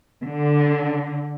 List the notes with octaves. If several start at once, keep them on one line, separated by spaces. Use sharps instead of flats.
D3